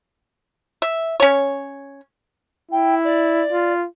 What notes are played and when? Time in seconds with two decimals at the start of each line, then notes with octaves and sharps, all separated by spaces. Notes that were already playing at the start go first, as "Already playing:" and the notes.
0.82 E5
1.20 C#4 C#5
2.72 E4 G5
3.04 D5
3.51 F4